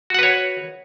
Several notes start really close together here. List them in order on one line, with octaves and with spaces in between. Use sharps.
F#4 F#5 B4 C#5